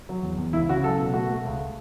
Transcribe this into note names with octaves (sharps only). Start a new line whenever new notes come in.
F#3
E2
E2
C#2 E4
C#3 F#4
F#3 A4
B2
A3 F#4
A3
C#2